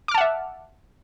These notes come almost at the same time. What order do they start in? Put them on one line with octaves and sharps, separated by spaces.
D6 F6 A5 F#5 E5